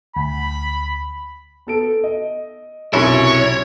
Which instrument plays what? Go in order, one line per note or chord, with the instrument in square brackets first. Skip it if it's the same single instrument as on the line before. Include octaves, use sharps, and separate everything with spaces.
[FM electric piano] D2 [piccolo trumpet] B5
[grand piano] B3 A4 D7
D#5
[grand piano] B1 [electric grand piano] F#2 [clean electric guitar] C3 C#4 E4 [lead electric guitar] C#5